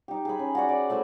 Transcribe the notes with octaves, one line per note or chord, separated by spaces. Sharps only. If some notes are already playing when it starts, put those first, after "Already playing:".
D#4 G4
G#4 B5
C#4
F#4 D5 F#5
D5
A3 E4 C5 C#5